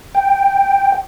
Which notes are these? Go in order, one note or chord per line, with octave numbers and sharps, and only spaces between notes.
G5